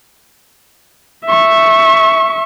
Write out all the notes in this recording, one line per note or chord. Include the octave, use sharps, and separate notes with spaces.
E5 C#6